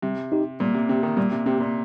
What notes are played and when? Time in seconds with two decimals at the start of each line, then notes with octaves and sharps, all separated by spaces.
0.02 C3 G3
0.32 D#4 G4
0.60 A#2 G3
0.74 C3
0.89 C3 C4 G4
1.03 D#3
1.17 A#2 G3
1.31 C3
1.46 C3 C4 G4
1.60 A#2